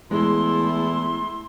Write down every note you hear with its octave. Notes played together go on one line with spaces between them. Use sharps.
E2 G#3 A3 E4 C6